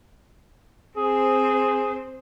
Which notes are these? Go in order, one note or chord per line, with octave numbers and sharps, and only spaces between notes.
C4 G#4 C5